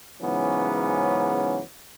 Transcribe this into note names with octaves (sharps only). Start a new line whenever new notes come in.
G#2 C#3 E3 F#3 B3 C#4